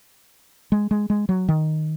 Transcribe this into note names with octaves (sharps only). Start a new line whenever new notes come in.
G#3
G#3
G#3
F#3
D#3